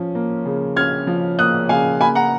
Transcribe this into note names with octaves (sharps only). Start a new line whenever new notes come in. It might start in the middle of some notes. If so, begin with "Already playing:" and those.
Already playing: F3 C#4
A#3
C#3
C#4 F6 G#6
F3
A#3 D#6 F#6
C#3 F5 G#5
A#3 G#5 B5
F#5 A#5